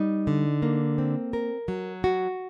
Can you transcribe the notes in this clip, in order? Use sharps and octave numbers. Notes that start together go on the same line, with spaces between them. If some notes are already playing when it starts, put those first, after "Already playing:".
Already playing: G3 D#4
D3
A#3
C4
A#4
F#3
F#4